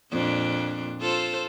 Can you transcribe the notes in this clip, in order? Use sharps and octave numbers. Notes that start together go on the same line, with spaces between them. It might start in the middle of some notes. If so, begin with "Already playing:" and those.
F2 A#2 D4
F4 A4 C5